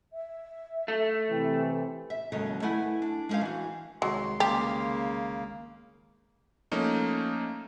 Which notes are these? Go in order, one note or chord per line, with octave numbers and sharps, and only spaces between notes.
E5
A3
C3 E3 G5
E5
D#2 C#3 F#3 G#3 A4 D#5
A3 E4 B4 F#5 G#5
D4
G#3 B3 C#4 C5 F5
E3 F#4
C2 D#3 F#3 G#3 C6
C#3 A#3 G4
F3 A3 A#3 C#4 D#4